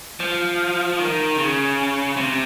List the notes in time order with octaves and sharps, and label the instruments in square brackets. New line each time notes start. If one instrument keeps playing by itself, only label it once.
[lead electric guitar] F3
D#3
C#3
C3